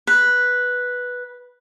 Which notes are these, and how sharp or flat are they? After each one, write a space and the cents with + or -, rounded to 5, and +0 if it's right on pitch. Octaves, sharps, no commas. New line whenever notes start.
B4 -5